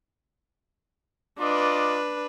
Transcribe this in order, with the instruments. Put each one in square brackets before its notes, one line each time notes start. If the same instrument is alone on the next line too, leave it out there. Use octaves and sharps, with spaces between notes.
[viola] D4 B4 [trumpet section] F4 D#5 D6